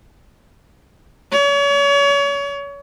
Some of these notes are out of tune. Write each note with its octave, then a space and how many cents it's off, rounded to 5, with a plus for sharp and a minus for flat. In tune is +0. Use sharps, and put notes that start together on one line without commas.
C#5 +35